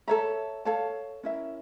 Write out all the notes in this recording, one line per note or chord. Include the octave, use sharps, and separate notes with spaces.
A4 C#5 E5 A#5
A4 C#5 F5 A5
C#4 E4 A#4 E5